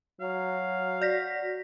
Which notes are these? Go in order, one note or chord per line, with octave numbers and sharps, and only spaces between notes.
F#3 F5
F#4 D5 A#6 B6